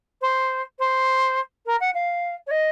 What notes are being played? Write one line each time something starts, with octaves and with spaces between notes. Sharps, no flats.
C5
C5
A#4
F#5
F5
C#5
D#5